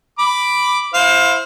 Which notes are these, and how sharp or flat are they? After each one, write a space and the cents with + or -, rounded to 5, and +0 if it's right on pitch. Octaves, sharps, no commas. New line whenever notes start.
B5 +0 D6 +0
E4 +0 C5 +0 F5 +25